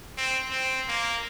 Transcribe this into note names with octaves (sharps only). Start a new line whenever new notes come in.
C4
C4
A#3